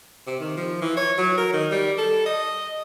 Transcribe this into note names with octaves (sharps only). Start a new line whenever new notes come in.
C3
D#3
F3
E3
C#5
F#3
A#4
D#3
G3
A4
D#5